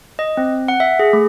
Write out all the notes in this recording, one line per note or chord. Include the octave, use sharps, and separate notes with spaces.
D#5
C4
F#5
E5
G#4
A3